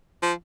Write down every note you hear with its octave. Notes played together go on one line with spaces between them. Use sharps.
F3